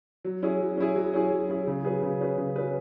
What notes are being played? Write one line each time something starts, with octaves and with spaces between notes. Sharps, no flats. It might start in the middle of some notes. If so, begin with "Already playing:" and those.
F#3
C#4 E4 G#4
F#3
C#4 E4 G#4
F#3
C#4 E4 G#4
F#3
C#4 E4 G#4
C#3
F#3 C#4 G#4 B4
C#3
F#3 C#4 G#4 B4
C#3
F#3 C#4 G#4 B4